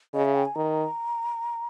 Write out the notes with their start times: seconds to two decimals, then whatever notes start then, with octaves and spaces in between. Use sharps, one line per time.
0.14 C#3 D#5
0.25 E5
0.35 G5
0.45 G#5
0.55 D#3 A#5